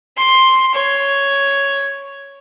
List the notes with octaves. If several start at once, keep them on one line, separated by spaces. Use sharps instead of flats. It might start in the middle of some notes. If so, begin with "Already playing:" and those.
C6
C#5